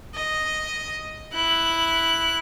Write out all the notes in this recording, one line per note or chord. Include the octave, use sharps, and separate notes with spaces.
D#5
E4 F#6